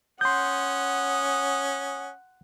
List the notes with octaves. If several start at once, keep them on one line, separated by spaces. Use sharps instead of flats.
C#4 F#5 C6 D#6 G6